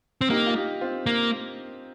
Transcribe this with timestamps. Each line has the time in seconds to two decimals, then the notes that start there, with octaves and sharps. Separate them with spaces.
0.21 C4
0.30 A#3 D#4 G4
0.47 F4
0.55 D#4 G4
0.81 C4 F4
1.06 A#3